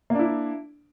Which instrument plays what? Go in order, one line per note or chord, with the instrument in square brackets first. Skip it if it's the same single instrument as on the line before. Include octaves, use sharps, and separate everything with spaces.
[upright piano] A#3
D4
E4